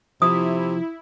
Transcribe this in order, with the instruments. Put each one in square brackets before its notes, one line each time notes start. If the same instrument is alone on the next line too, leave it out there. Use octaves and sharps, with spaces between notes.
[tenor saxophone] C3 [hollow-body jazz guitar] F3 [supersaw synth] E4 [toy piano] D#6